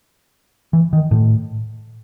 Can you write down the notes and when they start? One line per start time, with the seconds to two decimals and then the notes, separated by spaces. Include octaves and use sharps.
0.73 E3
0.93 D#3
1.11 A2